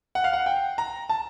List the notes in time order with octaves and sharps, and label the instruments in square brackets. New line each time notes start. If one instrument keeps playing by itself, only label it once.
[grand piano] F#5
F5
F#5
G5
A#5
A5